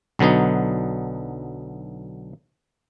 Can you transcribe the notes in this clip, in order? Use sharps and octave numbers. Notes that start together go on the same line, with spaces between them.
B1 D3 F#3 B3 D#4